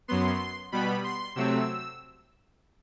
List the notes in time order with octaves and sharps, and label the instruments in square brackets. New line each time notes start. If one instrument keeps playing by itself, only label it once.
[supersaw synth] F#2 F#3 B3 C6
B2 G3 B3 B5
C6
C3 F#3 A3 C4 E6